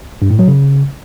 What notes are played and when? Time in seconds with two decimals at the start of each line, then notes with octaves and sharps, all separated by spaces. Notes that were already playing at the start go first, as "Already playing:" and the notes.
0.22 G2
0.30 A2
0.39 F#3
0.48 C#3